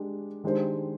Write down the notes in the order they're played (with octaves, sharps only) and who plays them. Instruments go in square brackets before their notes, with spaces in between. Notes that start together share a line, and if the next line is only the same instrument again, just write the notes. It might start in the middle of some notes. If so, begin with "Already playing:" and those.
Already playing: [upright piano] G#3 D4 G4
D#3 G#3 D4 G4 C5